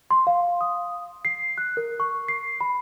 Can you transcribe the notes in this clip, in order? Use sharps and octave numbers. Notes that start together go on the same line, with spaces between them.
C6
F5
D#6
C7
F#6
A#4
C#6
C7
B5